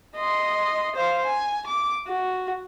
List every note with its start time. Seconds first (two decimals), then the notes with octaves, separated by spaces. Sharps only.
0.16 D#5 C6
0.96 C5 F5
1.26 G#5
1.67 D6
2.08 F#4